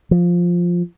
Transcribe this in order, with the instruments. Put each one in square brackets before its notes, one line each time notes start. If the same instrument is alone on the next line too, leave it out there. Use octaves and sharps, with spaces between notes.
[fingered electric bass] F3